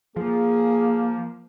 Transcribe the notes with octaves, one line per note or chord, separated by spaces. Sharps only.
F3 A#3 G#4